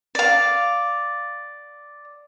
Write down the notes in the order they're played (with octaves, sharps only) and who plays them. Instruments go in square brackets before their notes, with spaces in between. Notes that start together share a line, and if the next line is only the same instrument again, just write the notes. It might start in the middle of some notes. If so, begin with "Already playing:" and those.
[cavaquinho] D5 F5